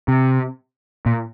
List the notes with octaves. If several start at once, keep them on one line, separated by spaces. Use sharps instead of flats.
C3
A#2